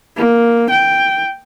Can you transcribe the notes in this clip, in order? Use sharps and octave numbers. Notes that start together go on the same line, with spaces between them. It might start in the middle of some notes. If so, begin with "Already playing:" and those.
A#3
G5